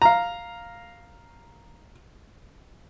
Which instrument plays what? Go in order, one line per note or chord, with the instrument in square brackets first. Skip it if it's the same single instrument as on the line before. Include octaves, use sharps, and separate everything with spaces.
[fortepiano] F5 A#5